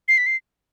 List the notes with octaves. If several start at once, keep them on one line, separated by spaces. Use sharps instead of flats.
C7
B6
C7